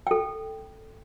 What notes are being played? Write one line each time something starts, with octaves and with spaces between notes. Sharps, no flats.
A4 G5